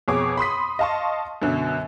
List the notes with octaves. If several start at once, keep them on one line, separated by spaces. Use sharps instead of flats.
F2 B2 G#4 C#5 D6
B5 C6 D#6 B6
D#5 F5 A5 C6 C#6
F#2 B2 D3 F#3